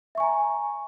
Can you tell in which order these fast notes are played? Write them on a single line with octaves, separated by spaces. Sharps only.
E5 C#6 G#5 A#5